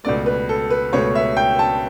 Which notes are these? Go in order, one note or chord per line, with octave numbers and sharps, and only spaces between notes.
C#2 B2 A3 D5
B4
A4
B4
C#2 B2 A3 C#5
E5
G5
A5